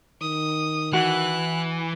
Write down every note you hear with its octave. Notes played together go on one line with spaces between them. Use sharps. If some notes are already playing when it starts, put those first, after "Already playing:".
D#3 D#6
E3 F#4 F#6